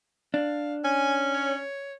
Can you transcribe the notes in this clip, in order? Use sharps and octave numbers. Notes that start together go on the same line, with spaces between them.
D4 F5
C#4 G#5
C#5